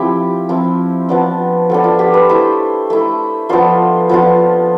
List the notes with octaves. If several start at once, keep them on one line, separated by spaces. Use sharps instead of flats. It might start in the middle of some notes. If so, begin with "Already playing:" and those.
Already playing: F3 C4 E4 G4
F3 C4 E4
F3 B3 D4
F3 B3 D4 A4
F4
G4
B4
A3 E4 C5
A3 E4
F3 B3 D4 F4 C5
F3 B3 D4 F4